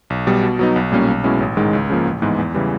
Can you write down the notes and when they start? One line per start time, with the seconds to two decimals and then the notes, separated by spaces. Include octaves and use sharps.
0.10 B1
0.27 B2 G3
0.43 B2
0.59 F#3 B3 D#4
0.76 B1
0.92 A#2 G3 A#3 C#4
1.08 B1
1.24 B2 G#3 C#4 E4
1.40 A1
1.57 G#2 D#3 G#3
1.73 C#2
1.90 C#3 F3 A#3
2.05 A1
2.22 G#2 E3 G#3 B3
2.38 E2
2.54 C#3 E3 G3